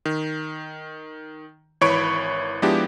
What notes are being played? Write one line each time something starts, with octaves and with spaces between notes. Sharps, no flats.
D#3
G#1 E3 C#5 B5 C#6 D7
F3 G#3 B3 D4 E4 G4